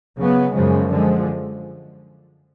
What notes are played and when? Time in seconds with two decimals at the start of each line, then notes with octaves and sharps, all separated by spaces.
0.18 C#3 F#3 B3
0.53 F#2 C#3 F3 G#3
0.90 D3 F3 G#3